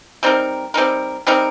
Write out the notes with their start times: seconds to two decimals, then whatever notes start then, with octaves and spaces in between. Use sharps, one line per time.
0.23 G3 C4 D#4 A#4
0.74 G3 C4 D#4 A#4
1.27 G3 C4 D#4 A#4